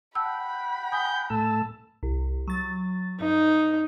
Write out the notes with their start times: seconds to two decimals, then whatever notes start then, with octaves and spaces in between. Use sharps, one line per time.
0.15 F#5 G5 A5 B5 E6
0.92 G#5 D#6 G6
1.30 A2 A3 A5 E6
2.03 C2
2.48 F#3 A6
3.20 G2 D#4